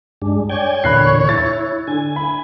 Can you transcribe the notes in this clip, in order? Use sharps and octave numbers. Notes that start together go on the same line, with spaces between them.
G2 G#3 D4
C#5 D5 G5 G#5
E2 A#2 D3 B5 F#6 C7
E4 A6
D3 G#5
E4 B5